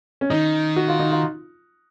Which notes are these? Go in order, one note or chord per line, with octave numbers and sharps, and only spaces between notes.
C#4
D#3 D#4
F#4
F4
D#4
F4